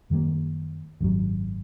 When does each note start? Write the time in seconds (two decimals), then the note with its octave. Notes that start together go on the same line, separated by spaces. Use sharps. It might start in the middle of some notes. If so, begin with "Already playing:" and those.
0.10 F#2 D#3 G3 A#3
1.01 G#1 F#2 D3 F#3